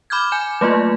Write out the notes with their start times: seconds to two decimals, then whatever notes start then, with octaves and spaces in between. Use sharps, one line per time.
0.10 B5 D6 F6 G6 G#6
0.32 G#5 G6 E7
0.61 F#3 A3 A#3 F4